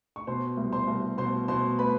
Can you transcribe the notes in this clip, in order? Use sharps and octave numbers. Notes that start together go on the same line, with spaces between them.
C#6
B2 C5 C6
C2
C5 C6
C2
B2 C5 C6
B2 C5 C6
B4 B5